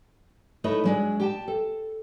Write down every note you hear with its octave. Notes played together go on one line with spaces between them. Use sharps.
A3 D#4 E4 B4 C#5 D#5
F#3 G#3 D4
G4 G5 A5
A4